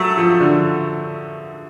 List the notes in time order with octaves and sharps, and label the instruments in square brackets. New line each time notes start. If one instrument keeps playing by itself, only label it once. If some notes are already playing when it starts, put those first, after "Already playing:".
Already playing: [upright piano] F#3 [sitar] A3
[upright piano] F3
D3